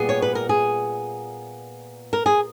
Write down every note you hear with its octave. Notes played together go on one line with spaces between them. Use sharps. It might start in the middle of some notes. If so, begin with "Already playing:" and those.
Already playing: A#2 G3 B3 G#4
C#5
B4
A#4
G#4
A#4
G#4